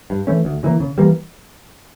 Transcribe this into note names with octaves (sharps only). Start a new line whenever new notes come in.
G2
E3 A3 C#4
D2
C#3 E3 A#3
C#3
E3 G3 A#3